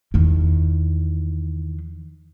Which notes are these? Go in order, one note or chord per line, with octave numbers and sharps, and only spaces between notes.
E2 D#3